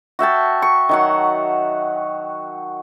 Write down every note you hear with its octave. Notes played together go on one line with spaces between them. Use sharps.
F#4 E5 G5 A5
C#6
D#3 F#3 F#5